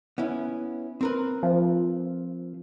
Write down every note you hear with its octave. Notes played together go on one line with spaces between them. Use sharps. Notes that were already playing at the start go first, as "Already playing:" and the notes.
B3 C#4 E4
C4 A#4 B4
F3